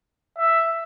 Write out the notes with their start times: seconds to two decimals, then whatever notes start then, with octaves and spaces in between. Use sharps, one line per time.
0.38 E5